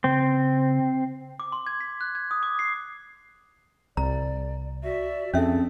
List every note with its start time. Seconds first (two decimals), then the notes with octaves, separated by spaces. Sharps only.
0.04 C#3 C4
1.40 D6
1.52 C6
1.67 G#6
1.81 B6
2.01 F#6
2.15 G#6
2.31 D#6
2.43 D6
2.59 C7
3.97 C2 D5 A#5
4.83 F#4 D5 E5
5.34 F2 C4 C#4 G#4 A4 E5